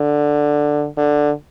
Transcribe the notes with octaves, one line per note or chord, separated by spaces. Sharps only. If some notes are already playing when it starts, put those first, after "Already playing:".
Already playing: D3
D3